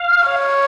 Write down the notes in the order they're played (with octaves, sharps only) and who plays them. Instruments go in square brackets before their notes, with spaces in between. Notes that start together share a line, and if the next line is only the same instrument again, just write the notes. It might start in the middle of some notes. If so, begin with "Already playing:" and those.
Already playing: [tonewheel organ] F5
[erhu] C#5